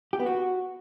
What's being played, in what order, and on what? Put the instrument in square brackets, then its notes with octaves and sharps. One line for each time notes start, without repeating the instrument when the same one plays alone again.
[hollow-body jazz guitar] G4
B3
F#4